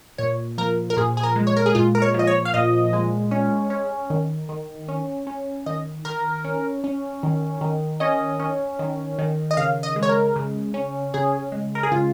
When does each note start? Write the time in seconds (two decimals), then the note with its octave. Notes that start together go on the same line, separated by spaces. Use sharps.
0.18 A#2 C#5
0.58 F3 A#4
0.90 A#4
0.97 A#2 G#4
1.17 G#4
1.23 A#4
1.36 G#3
1.47 C#5
1.57 A#4
1.66 G#4
1.75 A#2 F4
1.95 A#4
2.02 C#5
2.14 F3
2.19 D#5
2.27 C#5
2.45 F5
2.54 A#2 D#5
2.93 G#3
3.31 C#4
3.70 C#4
4.10 D#3
4.49 D#3
4.88 C#4
5.27 C#4
5.66 D#3 D#5
6.05 D#3 A#4
6.44 C#4
6.84 C#4
7.23 D#3
7.61 D#3
8.00 C#4 D#5
8.40 C#4
8.79 D#3
9.19 D#3
9.51 D#5
9.57 C#3 F5
9.83 D#5
9.96 G#3
10.03 C#5
10.09 A#4
10.36 C#3
10.74 C#4
11.14 C#3 G#4
11.52 G#3
11.75 A#4
11.83 G#4
11.91 C#3 F4